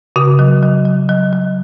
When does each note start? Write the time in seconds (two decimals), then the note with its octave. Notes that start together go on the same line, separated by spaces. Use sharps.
0.16 C#3 F#4
0.39 F#3
0.63 F#3
0.86 F#3
1.09 F#3
1.33 F#3